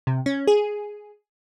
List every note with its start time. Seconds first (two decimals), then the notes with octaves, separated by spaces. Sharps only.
0.07 C3
0.26 C#4
0.47 G#4